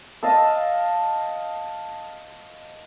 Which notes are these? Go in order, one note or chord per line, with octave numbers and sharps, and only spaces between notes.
D#5 F5 A5 E6